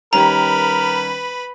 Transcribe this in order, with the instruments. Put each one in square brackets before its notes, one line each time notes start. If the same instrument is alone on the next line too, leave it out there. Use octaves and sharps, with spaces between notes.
[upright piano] D#3 G3 C#4 [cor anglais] A#4 [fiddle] B4 B5 [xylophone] A#5